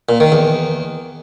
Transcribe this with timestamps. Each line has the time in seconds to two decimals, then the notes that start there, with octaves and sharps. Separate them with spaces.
0.09 A#2
0.20 D#3
0.32 E2